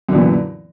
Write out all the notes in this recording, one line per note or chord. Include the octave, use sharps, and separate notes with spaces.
F#2 A#2 D3 E3